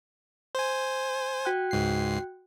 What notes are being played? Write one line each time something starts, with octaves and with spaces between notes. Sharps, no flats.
C5 G#5
F#4 G5 F#6
C#2 G#2 C7